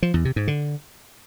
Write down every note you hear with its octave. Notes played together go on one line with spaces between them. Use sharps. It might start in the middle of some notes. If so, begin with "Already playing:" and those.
F3
E2
C3
G#2
D3